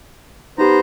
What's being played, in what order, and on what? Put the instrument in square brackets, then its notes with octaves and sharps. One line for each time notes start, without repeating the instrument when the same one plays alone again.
[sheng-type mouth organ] B3 C5 A#5 [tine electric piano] D#4 G4